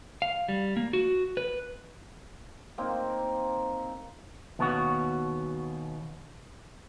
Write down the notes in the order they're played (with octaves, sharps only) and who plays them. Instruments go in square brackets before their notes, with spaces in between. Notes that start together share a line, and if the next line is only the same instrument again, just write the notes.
[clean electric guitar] F5
G3
A#3
F#4
B4
[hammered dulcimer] A#3 C4 D#4
[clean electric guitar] D#2 B2 B3 C#4 F4 F#4